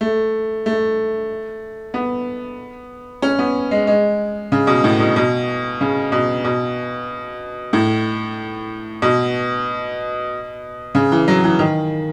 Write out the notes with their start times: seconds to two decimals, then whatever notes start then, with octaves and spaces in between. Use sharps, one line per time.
0.01 A3
0.66 A3
1.94 B3
3.22 C#4
3.39 B3
3.71 G#3
3.87 G#3
4.52 C#3
4.67 B2
4.84 A2
5.00 B2
5.16 B2
5.81 C#3
6.12 B2
6.45 B2
7.73 A2
9.02 B2
10.95 C#3
11.12 E3
11.28 F#3
11.44 E3
11.59 D#3